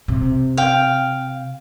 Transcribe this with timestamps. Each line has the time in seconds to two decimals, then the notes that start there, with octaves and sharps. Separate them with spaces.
0.08 C3
0.57 F5 G5